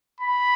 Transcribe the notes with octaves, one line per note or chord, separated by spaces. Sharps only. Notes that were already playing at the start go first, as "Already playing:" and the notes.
B5